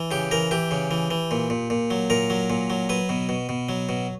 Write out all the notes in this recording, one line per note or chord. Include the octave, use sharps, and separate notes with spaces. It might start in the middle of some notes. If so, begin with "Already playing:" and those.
Already playing: E3
C#3 G4
E3 A#4
E3 G4
C#3
E3
E3
A#2
A#2
A#2
F#3
A#2 A#4
F#3
A#2
F#3
F#3 B4
B2
B2
B2
F#3
B2